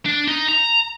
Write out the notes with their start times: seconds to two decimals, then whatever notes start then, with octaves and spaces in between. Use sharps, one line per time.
0.06 D4
0.28 D#4
0.49 A#5